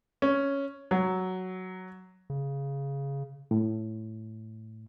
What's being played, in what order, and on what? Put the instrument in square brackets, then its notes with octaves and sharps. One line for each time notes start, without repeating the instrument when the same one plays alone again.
[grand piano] C#4
F#3
[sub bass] C#3
[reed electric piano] A2